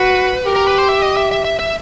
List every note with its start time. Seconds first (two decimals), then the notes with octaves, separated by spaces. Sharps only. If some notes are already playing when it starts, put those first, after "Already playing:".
Already playing: F#4 B4
0.46 G4 A#4
0.56 A#4
0.67 B4
0.78 C5
0.89 E5
1.02 D#5
1.17 E5
1.31 E5
1.44 E5
1.59 E5